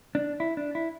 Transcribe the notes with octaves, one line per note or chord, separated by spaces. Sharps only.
D4
E4
D4
E4